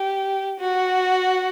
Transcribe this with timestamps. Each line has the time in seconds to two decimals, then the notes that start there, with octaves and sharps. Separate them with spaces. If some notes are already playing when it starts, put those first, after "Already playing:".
Already playing: G4
0.60 F#4